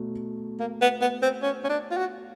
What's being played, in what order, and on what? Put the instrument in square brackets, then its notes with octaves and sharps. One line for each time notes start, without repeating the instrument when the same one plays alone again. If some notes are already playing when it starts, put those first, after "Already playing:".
Already playing: [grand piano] B2 F#3 A3
[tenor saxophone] A#3
B3
B3
C4
C#4
C#4
D4
F4
F#4